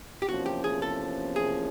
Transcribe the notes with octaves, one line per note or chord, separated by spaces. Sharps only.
G4
E2 C3 F3 A#3 C#4 F#4
G4
G#4
A4
G#4